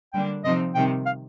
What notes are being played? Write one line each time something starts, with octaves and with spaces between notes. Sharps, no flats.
D3 G3 A#3 D4 G5
C3 F3 C4 D#4 D#5
C3 D#3 G3 G5
F5